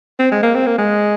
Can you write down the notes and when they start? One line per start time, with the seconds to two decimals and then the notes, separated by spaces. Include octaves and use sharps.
0.19 C4
0.32 G#3
0.43 A#3
0.55 C4
0.66 A#3
0.78 G#3